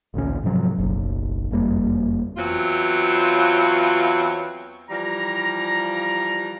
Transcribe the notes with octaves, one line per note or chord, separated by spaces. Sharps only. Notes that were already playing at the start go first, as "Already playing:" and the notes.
A1 D2 A#2 C#4
G#2 C3 F3 F#3
F#1 B1
F#1 F2 G3 A#3
E2 F#3 C4 F4
E3 F3 G3 G4 A#5